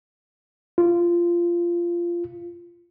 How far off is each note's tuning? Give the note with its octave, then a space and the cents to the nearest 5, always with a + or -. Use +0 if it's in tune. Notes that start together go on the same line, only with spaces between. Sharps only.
F4 -15